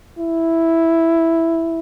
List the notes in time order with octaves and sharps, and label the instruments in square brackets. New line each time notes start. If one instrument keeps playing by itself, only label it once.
[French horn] E4